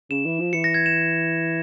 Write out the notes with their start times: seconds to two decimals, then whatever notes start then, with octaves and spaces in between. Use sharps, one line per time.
0.10 C#3 E7
0.25 E3
0.40 F3
0.53 E3 C#7
0.64 A#6
0.74 G#6
0.86 E7